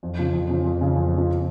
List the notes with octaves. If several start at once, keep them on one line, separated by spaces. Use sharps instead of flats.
F2
C#3 F3
F2
C#3 F3
F2
C#3 F3
F2
C#3 F3